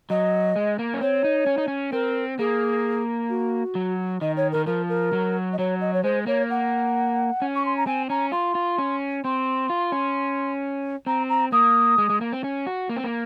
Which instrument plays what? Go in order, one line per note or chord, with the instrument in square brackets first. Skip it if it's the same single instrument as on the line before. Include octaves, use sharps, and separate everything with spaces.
[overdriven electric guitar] F#3 [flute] D#5
[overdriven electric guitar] G#3
A#3
C#4
[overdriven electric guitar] C4 [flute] C#5
[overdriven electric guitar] D#4
C#4
D#4
C#4
[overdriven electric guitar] C4 [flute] A#4
[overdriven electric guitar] A#3 [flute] G#4
[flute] F#4
[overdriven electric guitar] F#3
[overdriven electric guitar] D#3 [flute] D#5
[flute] C#5
[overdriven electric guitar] D#3 [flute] A#4
[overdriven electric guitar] F3 [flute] A#4
[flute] A#4
[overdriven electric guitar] F#3
[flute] D#5
[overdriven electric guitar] F#3 [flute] C#5
[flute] D#5
C#5
[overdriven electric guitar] G#3 [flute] C5
[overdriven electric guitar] A#3 [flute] C#5
[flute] F#5
[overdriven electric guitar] C#4
[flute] C#6
C6
A#5
[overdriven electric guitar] C4 [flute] G#5
[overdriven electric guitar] C#4 [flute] A#5
[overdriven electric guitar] F4 [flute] C6
[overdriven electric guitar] F4
C#4
[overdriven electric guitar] C4 [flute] C6
[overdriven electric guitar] F4
C#4
[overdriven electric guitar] C4 [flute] A#5
[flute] A#5
[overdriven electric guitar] A#3 [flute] D#6
[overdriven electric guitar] G#3
G#3
A#3
C4
C#4
F#4
A#3
C4
A#3